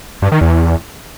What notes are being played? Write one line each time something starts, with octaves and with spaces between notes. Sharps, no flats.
G2
D#3
E2